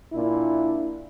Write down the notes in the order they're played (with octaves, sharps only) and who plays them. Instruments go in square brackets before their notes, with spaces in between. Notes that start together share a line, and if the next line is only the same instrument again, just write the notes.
[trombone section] A#2 D4 E4